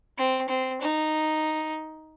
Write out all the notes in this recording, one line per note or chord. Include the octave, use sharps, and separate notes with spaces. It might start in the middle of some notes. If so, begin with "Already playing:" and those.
C4
C4
D#4